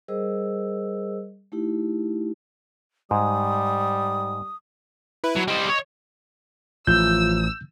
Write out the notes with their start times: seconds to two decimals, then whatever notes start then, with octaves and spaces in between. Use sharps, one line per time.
0.08 G3 G#4 A#4 C5 D#5 E6
1.52 A3 D#4 E4 G4
3.11 G#2 G3 D#6
5.24 E4 B4
5.36 F#3
5.48 G3 C5 D#5
5.69 C#5
6.87 A1 F3 E6 G6